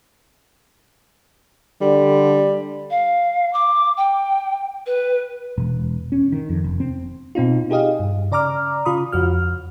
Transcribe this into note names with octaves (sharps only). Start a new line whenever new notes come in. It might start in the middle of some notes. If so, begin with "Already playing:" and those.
D3 G3
F5
D6
G5
B4
E1
C#4
D#3
F2
F1
C4
B2 C4 D#4 F4
D#4 G4 G#4 D#5 F5
G2
C#3 D5 A#5 D6 F6
C#3 F4 B5 D#6
F2 F#4 F6